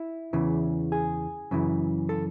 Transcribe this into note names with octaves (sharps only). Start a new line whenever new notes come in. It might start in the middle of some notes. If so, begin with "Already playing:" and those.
Already playing: E4
E2 C#3 E3
G#4
F#2 C#3 E3
A4